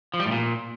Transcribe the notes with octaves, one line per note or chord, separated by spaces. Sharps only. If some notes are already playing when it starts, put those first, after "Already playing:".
F3
G3
A2
A#2